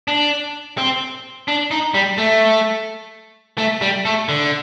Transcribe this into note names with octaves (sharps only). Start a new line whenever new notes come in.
D4
C4
D4
D#4
G3
A3
A3
G3
A3
D3